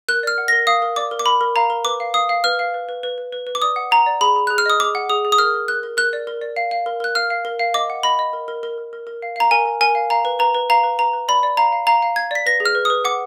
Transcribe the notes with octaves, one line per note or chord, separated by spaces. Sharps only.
A#4 F#6
D5 F6
F#5
A#6
A#4
F5 D#6
A#4
D5 D6
A#4
D6
A#4 B5
A#4
F5 A#5
A#4
B4 D6
F5
F5 D#6
F5
B4 F6
F5
B4
B4
B4
B4
B4
B4
D6
D5 D#6
F#5
F#5 A#5
D5
G#4 B5
G#4
G#4 F#6
F6
D#5 D#6
G#4 D6
F#5
G#4 D#6
G#4
D#6
A#4 F6
A#4
A#4 F#6
A#4
A#4 F#6
D5
A#4
D5
F5
F5
A#4
A#4 F#6
F5 F6
F5
A#4
F5
D#5 D6
F#5
D#5 B5
D#5
A#4
A#4
A#4
A#4
A#4
A#4
F5
F5 A#5
A#4 G#5
A#4
A#4 G#5
F5
F5 A#5
B4
B4 A#5
B4
F5 A#5
B4
B4 A#5
B4
D5 B5
D5
F5 A#5
F5
F5 A#5
F5
F5 G#6
D5 B6
B4 A#6
G#4
F6
B4
D#6
B4
F#5 D6